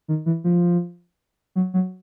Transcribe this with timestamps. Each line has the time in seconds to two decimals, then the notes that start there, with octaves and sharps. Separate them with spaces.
0.08 D#3
0.26 E3
0.44 F3
1.56 F#3
1.74 F#3